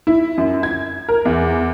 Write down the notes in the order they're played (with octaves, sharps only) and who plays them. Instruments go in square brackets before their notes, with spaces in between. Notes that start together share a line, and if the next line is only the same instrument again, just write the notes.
[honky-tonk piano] E4
F#2
G#6
A#4
E2